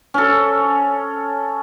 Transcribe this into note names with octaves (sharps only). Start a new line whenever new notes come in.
C#4 A4